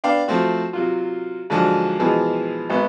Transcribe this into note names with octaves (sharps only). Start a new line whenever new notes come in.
B3 D4 F5 G5
F3 A3 C4 F#4
C3 F#3 F4
G#2 D3 F3 F#3
B2 E3 F3 G#3
G#1 B3